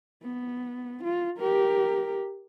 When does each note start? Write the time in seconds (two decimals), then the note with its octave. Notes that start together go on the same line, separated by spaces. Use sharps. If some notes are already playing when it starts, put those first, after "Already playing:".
0.23 B3
1.04 F4
1.38 G4 A#4